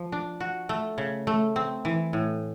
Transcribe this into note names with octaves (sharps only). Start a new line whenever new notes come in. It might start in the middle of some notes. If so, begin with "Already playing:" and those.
Already playing: F3
D4
F#4
A3
C#3
A3
C4
E3
A2